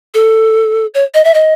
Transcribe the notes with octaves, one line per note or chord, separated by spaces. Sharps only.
A4
C#5
D#5
E5
D#5